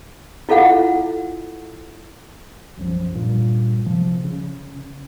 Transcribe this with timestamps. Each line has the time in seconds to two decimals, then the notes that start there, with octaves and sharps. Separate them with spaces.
0.49 E4 F4 A4 F5 F#5
2.77 B1 F#2 F3
3.15 G2 A#2
3.86 C3 F3
4.24 C#3